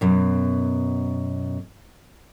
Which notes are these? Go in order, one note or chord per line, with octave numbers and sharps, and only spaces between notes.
F#2 B2